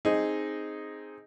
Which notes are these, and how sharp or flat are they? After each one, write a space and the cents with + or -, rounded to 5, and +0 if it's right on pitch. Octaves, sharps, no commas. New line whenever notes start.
C4 +5 D#4 +0 G#4 +0